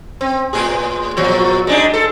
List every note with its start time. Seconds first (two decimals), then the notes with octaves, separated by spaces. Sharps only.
0.21 C4
0.53 A2 G#4
1.17 A#2 F3 F#3
1.67 G#3 D4 D#4
1.94 A4